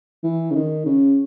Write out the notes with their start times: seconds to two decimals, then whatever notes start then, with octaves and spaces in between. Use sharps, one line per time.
0.23 E3
0.51 C#3
0.55 D#3
0.85 C#3